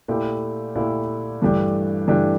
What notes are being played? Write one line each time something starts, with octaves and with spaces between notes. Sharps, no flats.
A#2 A3 E4 G4
A#2 A3 E4 G4
G2 E3 A3 D4 G4
G2 E3 A3 D4 G4